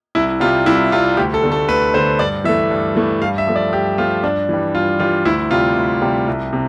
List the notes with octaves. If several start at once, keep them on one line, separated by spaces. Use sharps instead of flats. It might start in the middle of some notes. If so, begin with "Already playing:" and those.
C2 E4
C3 G3 F4
C2 E4
C3 G3 F4
D2 G4
A4
D3 A3
A4
D2 B4
D3 A3 C5
G2 D5
E3 A3 E5
G2
E3 A3
G2 F5
E5
F3 A3
D5
G2 G4
F3 A3 F4
G2 D4
E3 G3
G2 F4
E3 G3 F4
D2 E4
C3 G3 F4
D2
C3 G3
C2
C3